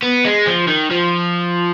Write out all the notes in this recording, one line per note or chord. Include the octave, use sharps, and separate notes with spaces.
B3
G#3
F3
D#3
F3